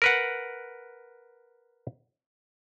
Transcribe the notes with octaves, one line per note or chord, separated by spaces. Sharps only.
A#4 B4 F#5